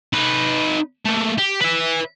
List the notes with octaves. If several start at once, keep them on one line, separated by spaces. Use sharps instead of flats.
D#4 B4
A3 A#3
G4
B4 E5